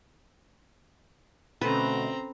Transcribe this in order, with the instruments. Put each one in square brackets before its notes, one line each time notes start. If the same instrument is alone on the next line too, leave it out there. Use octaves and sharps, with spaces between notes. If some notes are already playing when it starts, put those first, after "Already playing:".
[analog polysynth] B2 D3 A3 [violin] C4 A#5 [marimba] C#4 A4 [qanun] B4